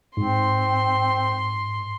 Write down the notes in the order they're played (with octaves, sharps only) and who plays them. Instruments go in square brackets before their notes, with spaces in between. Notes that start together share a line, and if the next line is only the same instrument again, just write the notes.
[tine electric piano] G#2 [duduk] C4 [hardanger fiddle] C6